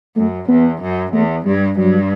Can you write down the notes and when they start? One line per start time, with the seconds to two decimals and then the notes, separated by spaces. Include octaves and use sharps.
0.16 F#2 A3
0.48 E2 B3
0.81 F#2
1.12 E2 A3
1.45 G2 G3
1.77 G2 F#3